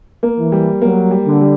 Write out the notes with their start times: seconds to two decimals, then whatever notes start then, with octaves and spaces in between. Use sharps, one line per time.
0.23 A#3
0.39 E3
0.52 G3
0.81 F#3 A#3
1.11 G3
1.26 D3
1.41 G3